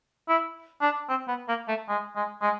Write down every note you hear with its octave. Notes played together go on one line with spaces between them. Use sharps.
E4
D4
C4
B3
A#3
A3
G#3
G#3
G#3